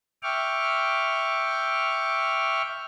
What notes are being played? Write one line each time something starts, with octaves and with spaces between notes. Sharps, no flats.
E5 G5 C#6 D6 F6